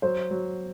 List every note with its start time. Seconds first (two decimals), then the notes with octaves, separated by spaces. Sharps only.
0.02 F#3 C5
0.31 F#3